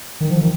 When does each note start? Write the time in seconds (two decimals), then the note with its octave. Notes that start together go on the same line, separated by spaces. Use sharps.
0.21 D#3
0.30 F3
0.41 D#3